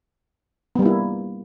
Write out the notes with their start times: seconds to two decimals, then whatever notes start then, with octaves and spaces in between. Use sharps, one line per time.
0.75 B3
0.79 G3
0.82 A#3
0.86 E4